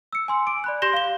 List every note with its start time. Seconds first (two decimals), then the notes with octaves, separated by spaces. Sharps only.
0.13 E6 C#7
0.28 G#5 C6 E6
0.47 D6 D7
0.64 D5 B5 F#6
0.82 G4 C6 G6 A#6 E7 G7
0.93 F5 G7